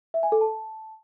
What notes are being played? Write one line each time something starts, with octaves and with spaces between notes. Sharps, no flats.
E5
G#5
A4
A5